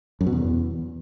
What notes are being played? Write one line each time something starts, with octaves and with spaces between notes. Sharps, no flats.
F#2
B2
E2